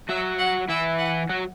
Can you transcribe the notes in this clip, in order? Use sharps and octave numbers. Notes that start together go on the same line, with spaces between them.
F#3 F#4 E5
F#5
E3 E4 E5
F#5
F#3 F#4